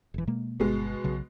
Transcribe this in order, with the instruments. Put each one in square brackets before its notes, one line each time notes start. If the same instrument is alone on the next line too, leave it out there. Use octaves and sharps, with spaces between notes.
[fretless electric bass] E1 E3
B2 G#3 A#3
[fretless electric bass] G1 [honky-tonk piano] B2 G#3
[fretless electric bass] B1 C#3 F#3